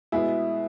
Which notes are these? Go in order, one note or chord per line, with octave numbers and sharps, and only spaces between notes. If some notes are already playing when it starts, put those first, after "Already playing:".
B2 G#3 E4 G#4